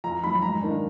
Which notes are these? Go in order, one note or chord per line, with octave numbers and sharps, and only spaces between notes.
F2 A#5
D#3 F#3 B5
G#2 A#5
D#3 A#3 D4